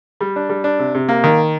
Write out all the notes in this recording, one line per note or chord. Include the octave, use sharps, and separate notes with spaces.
G3
D4
G3
D4
C3
C3
A#3
D#3